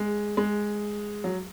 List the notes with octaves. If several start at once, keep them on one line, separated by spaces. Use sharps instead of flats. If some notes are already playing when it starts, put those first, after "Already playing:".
Already playing: G#3
G#3
F#3